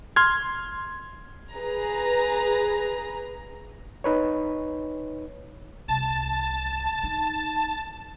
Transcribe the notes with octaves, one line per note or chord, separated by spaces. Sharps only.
C6 F6 G#6
G#4 B4 A#5
D#4 B4 C#5
C2 A5
D#4